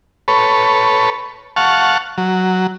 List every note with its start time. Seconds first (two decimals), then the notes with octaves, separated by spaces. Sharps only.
0.28 A4 B4 C#5
1.56 F5 F#5 A5 C#6
2.18 F#3